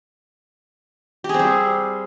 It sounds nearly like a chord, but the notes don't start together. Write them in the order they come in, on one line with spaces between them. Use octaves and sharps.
G4 G#4 C4 G3